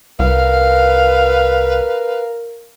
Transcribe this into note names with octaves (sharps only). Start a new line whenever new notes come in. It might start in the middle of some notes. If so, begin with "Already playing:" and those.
C2 A#4 B4 F5